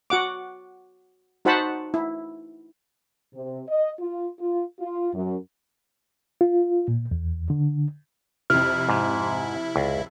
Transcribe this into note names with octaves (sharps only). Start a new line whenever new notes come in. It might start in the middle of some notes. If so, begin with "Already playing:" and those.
F#4 F#5 D6
D#4 F#4 C5 F#5 A5 B5
E4
C3
D#5
F4
F4
F4
F#2
F4
A#2
E2
D3
F2 C3 E4 F6
G#2
C#2